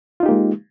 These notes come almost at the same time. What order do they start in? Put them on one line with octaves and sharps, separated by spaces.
F4 D#4 G4 A#3 G#3